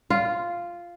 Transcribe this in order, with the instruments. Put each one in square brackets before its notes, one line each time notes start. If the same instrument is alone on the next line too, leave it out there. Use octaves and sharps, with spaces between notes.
[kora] F4